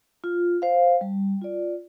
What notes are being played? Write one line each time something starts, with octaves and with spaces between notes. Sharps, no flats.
F4
C5 F5
G3
F4 D5